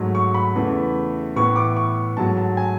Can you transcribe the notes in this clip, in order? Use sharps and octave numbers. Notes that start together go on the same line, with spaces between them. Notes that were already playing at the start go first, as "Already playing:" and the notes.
Already playing: G#2 F#3 A3
C#6
B5
E2 C#3 E3 A3
A2 E3 B3 C#6
D6
C#6
G#2 F#3 A3 A5
A5
G#5